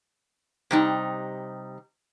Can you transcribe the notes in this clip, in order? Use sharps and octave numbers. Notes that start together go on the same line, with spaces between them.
C3 G3 D#4